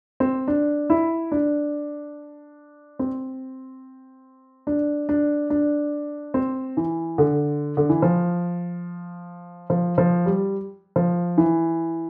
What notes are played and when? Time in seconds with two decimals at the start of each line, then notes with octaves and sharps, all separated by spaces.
0.20 C4
0.48 D4
0.90 E4
1.32 D4
2.99 C4
4.67 D4
5.09 D4
5.50 D4
6.34 C4
6.77 E3
7.18 D3
7.77 D3
7.89 E3
8.02 F3
9.70 F3
9.98 F3
10.26 G3
10.96 F3
11.38 E3